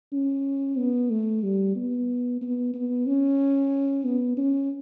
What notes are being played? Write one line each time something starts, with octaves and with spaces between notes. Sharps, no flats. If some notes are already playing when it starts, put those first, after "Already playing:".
C#4
B3
A3
G3
B3
B3
B3
C#4
B3
C#4